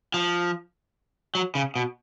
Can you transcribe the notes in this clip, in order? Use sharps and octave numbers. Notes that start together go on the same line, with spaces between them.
F3
F#3
C#3
B2